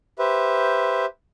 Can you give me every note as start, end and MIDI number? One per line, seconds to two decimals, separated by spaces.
0.19 1.05 67
0.19 1.05 71
0.19 1.05 72
0.19 1.05 76